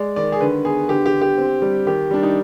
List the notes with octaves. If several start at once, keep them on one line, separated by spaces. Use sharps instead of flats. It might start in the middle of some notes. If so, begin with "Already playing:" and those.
Already playing: G#3 D5
D#3 D5
G#4
D3 B4
B3 G#4
D3 G4
G4
D3
G4
C4
G3
D#3 G4
G3 D4
D#4